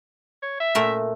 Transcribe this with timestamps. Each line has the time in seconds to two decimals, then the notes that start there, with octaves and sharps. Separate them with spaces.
0.43 C#5
0.60 E5
0.75 A#2 A3 A#4